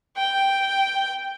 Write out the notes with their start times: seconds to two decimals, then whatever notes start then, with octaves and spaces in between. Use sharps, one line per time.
0.17 G5